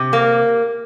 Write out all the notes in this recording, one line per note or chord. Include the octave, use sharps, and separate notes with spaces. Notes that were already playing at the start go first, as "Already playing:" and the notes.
Already playing: C3
A#3